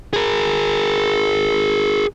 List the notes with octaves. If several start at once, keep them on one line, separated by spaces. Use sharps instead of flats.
G#4 A#4